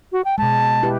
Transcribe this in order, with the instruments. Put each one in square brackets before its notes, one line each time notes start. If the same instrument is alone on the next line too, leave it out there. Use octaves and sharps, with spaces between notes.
[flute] F#4
G5
[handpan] B2 G#3 [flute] A5
[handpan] E4 G4 B4